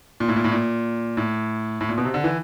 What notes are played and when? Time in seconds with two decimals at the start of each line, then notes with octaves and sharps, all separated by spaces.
0.20 A#2
0.28 A2
0.36 A#2
0.44 A2
0.51 A#2
1.17 A2
1.81 A2
1.89 A#2
1.98 B2
2.05 C3
2.14 D3
2.24 E3